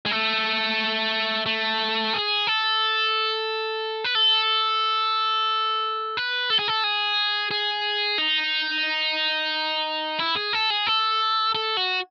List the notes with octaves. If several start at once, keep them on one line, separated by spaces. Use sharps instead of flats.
G#3
A3
A3
G#4
A4
B4
A4
B4
A4
G#4
A4
G#4
G#4
D#4
E4
G#4
A4
G#4
A4
A4
F#4